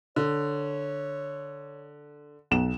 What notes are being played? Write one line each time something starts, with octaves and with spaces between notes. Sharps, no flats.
D3 C#5
B1 E7